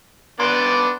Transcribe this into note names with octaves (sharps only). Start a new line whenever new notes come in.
B3 D4 D5 C6 F#6